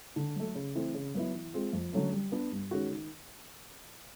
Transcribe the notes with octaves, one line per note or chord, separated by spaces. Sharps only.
D3
F#3 A3
C#3
E3 A3 C4
C#3
F#3 B3 E4
E3
G#3 C4 F4
F2
D3 F#3 A3 C#4
G3
B3 D4
G2
D#3 G#3 C#4 F#4
D#3